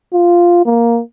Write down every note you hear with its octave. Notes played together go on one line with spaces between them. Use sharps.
F4
A#3